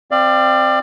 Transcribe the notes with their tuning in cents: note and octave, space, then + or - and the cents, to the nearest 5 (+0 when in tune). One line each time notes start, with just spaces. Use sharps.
C4 +0 D5 +25 F5 -25